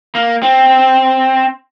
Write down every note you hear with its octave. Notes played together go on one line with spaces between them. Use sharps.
A#3
C4